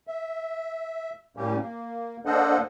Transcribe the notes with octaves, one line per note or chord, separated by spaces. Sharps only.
E5
A2 G3 A#3 C#4 G4
A#3
A#3 D4 A4 C5 D#5 F#5